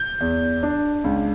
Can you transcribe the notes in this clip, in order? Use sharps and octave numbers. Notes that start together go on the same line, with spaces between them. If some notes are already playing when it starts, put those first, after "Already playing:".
Already playing: G6
E2
D4
C#2